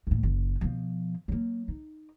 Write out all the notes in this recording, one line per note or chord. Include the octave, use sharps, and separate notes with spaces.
D#2 A2
F#1
B2 F3
F#3 A#3
D#4